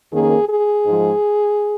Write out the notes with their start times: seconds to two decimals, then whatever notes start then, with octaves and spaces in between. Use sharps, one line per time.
0.10 F2 D#3 A#3 C#4 G#4
0.48 G#4
0.85 G#2 F3 G#3